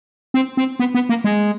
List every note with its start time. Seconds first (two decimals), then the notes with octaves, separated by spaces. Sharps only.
0.34 C4
0.57 C4
0.80 B3
0.95 B3
1.09 A#3
1.24 G#3